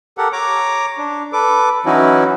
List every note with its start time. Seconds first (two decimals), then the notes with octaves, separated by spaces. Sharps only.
0.18 G4 A4 A#4 F#5
0.32 C#5 A#5 D6
0.98 D4
1.33 A4 B4 D6
1.86 E3 F#3 C#4 D#4 E4 F#4